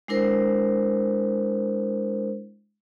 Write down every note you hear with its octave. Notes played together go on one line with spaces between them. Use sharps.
G#3 D4 E4 A#4 C5